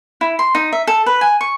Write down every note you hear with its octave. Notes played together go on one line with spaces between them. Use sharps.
E4
C6
D#4
E5
A4
B4
G#5
C#6